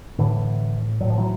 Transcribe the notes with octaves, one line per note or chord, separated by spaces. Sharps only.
A2 D3 E3
A2 F#3
F3
E3 F#3